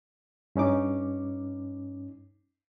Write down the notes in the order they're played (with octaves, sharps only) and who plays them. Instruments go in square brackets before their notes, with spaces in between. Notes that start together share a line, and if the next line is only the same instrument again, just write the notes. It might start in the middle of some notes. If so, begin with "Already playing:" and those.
[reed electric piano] G2 C#4 D#4 D6